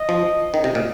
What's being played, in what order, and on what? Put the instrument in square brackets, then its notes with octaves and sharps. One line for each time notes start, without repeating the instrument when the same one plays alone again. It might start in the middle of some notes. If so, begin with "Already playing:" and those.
Already playing: [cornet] D#5
[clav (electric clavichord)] F3
[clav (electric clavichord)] D#3 [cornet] D#5
[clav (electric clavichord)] C3
A#2